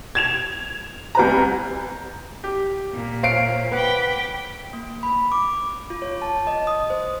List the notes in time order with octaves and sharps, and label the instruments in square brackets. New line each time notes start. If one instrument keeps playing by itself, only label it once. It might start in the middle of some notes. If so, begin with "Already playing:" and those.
[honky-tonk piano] G#6 E7 F7
C2 B4 A#5
[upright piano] G4
[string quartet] A#2
[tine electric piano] C5 C#5 [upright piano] F5 C7 D7
[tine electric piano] B4 F#5 [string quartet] G5 B5 D6
[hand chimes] A#3
B5
D6
F4
C#5
A5
D#5
D#6
C5